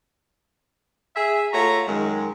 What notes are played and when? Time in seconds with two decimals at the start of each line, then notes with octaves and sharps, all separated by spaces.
1.17 G#4 E5
1.53 A3 F4 F#4 C#5 A#5
1.88 F#2 D#3 G#3